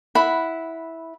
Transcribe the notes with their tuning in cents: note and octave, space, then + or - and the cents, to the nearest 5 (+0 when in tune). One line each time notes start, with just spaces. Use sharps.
E4 -10 F#5 +0 B5 +0